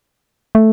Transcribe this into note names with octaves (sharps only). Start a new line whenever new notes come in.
A3